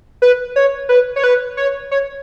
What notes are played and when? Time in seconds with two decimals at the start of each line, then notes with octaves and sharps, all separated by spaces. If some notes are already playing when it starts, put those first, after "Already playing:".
0.22 B4
0.56 C#5
0.89 B4
1.16 C#5
1.24 B4
1.57 C#5
1.91 C#5